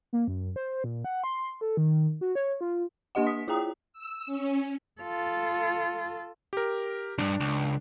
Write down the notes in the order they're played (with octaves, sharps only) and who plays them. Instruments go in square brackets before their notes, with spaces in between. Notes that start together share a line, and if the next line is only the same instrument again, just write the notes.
[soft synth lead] A#3
F#2
C5
A#2
F#5
C6
A4
D#3
F#4
C#5
F4
[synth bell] A#3 D4 G4 D#5 F#5
D#6 B6
E4 F4 G#4 G5 A#5 D#6
[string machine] E6
C#4
[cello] F4 A4
[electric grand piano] G4 A#4
[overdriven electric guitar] C2 G2 [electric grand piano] D4
[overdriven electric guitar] C#2